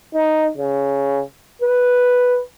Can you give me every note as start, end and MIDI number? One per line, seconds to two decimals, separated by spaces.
0.14 0.49 63
0.57 1.22 49
1.62 2.40 71